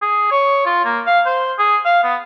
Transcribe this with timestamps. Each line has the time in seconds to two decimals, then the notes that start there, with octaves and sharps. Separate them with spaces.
0.02 G#4
0.32 C#5
0.66 F4
0.85 A#3
1.07 F5
1.26 C5
1.59 G#4
1.85 F5
2.04 B3